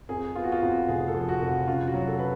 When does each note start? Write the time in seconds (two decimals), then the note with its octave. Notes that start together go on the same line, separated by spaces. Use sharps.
0.09 F2 G#4
0.36 B3 F4
0.44 F#4
0.52 F4
0.62 F2 F#4
0.88 F1 G#4
1.08 A4
1.14 F3
1.29 F#4
1.41 F1
1.48 F#4
1.67 C#3 F4
1.88 F#4
1.94 F#3
2.07 A4
2.19 B4